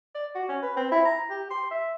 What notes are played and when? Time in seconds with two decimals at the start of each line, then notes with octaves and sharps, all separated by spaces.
0.15 D5
0.35 F#4
0.49 C#4
0.62 B4
0.77 C4
0.92 E4
1.05 A#5
1.30 G4
1.50 C6
1.71 E5